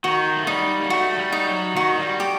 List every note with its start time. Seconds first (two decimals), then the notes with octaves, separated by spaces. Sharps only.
0.04 D#3 F#4
0.37 A3
0.46 G3 D#4
0.81 A#3
0.90 A3 F#4
1.18 G3
1.32 D#4
1.47 F#3
1.76 D#3 F#4
1.98 G3
2.20 G4